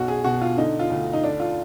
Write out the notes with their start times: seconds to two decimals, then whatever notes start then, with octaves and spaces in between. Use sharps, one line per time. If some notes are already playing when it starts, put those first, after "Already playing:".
Already playing: B1 F#4
0.08 G#4
0.24 B2 F#4
0.41 F4
0.57 D3 D#4
0.79 F4
0.90 D2
1.13 D#4
1.24 D3 D4
1.40 F4